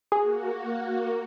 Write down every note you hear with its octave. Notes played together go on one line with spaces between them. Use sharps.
A#3 F#4 G#4